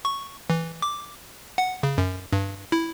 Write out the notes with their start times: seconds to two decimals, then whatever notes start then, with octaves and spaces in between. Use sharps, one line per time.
0.05 C#6
0.50 E3
0.82 D6
1.58 F#5
1.83 C#3
1.98 F#2
2.33 G2
2.72 E4